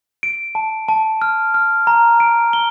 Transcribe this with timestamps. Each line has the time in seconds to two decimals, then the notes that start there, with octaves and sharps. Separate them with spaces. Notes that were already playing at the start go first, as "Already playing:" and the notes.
0.23 D7
0.55 A5
0.88 A5
1.22 F6
1.54 F6
1.87 A#5
2.20 D7
2.53 G7